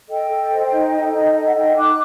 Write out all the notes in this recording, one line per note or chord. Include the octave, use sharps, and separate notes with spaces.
A4 D#5 G5
A4
C5
D#4
A4
D#4 D#5
A4 D#5
F#5
D#4 D#5 G5
D#4 D6 F#6